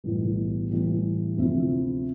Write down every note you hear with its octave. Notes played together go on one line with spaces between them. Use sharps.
B1 A2 E3 G3 B3
A2 E3 G3
D2 C3 F3 C4 E4